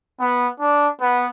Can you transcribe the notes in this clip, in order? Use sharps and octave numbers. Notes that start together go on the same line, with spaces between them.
B3
D4
B3